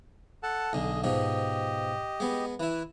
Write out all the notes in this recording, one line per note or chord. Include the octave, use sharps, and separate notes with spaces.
A4 F#5 A5
B1 D3 G#4 D#5
G#2 B2 F3 G4 D#5
G#3 B3
E3 E4 B4